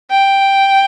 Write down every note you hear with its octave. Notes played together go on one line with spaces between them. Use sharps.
G5